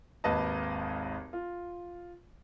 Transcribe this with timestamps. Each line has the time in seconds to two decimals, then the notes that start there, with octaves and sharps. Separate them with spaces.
0.24 G#1 D#2 B4 D#5 A5
1.33 F4